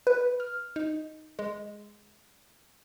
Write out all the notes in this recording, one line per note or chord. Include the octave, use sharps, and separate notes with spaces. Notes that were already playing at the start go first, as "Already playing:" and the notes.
B4
F6
D#4
G#3